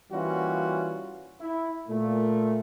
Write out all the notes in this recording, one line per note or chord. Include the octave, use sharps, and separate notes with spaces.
E3 G3 A#3 C#4 F4 F#4
E4
A#2 A3